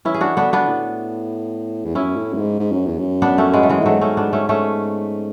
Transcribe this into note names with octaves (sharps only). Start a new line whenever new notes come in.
E3 C#4 E4
G#4
D4 F#4
D3 B3 D4
B3 D4
A2
E2
F#2 C#4 E4
A2
F#2
G#2
G#2
F#2
E2
F#2
B3 D4
A3 C#4
G#3 B3
A3
E3 G#3
A2
G#2 F#3 A3
A3 C#4
B3 D4
A3 C#4
A3 C#4